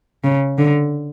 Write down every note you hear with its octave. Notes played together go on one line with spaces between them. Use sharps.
C#3
D3